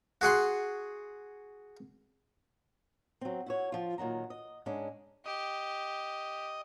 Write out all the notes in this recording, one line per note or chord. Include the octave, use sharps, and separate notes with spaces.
F#4 G#4 F#5 C6
F#3 C4
E4 F#4 C#5
F3 F4
A#2 D#3 F#3 A#5
D#5
G#2 G#3 C#4 D4
G4 D#5